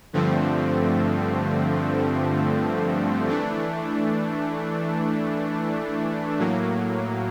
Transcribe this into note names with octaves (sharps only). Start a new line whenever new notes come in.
G2 D3 F3 A3 C4
E3 A3 D4
A2 F#3 A#3